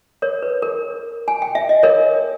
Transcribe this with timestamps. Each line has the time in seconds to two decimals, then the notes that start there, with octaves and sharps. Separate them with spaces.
0.22 A#4 C#5
0.42 B4
0.62 A#4
1.28 G#5
1.42 G5
1.55 E5
1.69 D#5
1.83 A#4 C#5